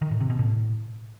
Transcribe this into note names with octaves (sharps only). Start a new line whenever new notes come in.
D#3
A2
C3
B2
A2